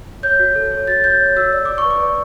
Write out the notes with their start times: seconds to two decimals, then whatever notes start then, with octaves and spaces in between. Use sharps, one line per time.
0.23 C#5 G6
0.39 F#4
0.55 A4
0.72 C#5
0.87 F#4 A6
1.04 F#4 G6
1.20 C#5
1.36 F#4 E6
1.52 D5 E6
1.65 D5 D6
1.78 C#6
1.85 B4
1.90 D6
2.01 D5